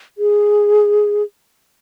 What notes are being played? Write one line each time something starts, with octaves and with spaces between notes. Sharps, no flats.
G#4